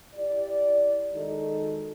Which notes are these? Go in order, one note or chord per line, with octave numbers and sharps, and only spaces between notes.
E4 G4 D5
D#3 G#3 D#4 F#4 A4